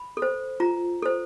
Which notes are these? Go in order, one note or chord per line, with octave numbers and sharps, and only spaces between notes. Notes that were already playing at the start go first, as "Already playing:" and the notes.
Already playing: B5
A4
C5
F4 A#5
A4 C5